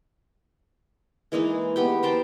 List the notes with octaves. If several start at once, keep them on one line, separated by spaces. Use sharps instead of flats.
E3 G#3 A#3 D#4
B3 G4 G5
A#4 C5 G5 A5